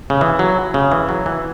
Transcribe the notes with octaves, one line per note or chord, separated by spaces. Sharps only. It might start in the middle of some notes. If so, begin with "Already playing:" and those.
C#3
E3
F#3
C#3
E3
F#3
E3